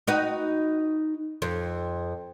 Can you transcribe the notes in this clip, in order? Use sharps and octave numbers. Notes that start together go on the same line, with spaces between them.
D#4 F#4 B4
F2